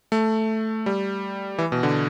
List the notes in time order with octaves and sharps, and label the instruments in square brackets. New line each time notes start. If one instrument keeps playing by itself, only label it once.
[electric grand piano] A3
G3
E3
B2
D3